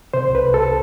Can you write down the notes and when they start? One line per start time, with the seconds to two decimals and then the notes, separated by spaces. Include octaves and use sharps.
0.14 C3 C5
0.29 C2
0.35 B4
0.45 C2
0.54 A4